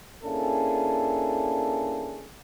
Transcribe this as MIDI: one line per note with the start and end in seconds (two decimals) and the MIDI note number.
0.23 2.28 58
0.23 2.28 61
0.23 2.28 62
0.23 2.28 64
0.23 2.28 68
0.23 2.28 69